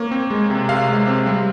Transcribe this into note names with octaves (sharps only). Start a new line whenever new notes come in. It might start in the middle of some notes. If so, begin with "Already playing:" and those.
Already playing: A#3 C#5
C4
G#3
C3
C3 F5
G#3
C4
G3